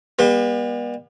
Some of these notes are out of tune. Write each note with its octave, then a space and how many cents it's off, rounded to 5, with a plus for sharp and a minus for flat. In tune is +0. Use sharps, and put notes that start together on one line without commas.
G3 +35 B3 -40